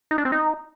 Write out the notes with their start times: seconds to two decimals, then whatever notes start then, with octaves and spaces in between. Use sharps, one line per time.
0.11 D#4
0.18 D4
0.25 C4
0.32 D#4